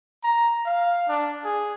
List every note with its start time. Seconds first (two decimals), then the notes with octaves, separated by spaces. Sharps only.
0.24 A#5
0.66 F5
1.09 D4
1.45 G#4